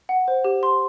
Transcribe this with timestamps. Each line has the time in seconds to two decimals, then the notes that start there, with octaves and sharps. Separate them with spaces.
0.09 F#5
0.28 C5
0.44 G4
0.63 C6